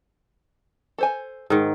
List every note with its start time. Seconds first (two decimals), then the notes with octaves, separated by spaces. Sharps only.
0.98 A4 C5 G#5
1.50 G#2 D#3